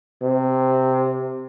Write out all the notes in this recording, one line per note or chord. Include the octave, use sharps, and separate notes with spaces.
C3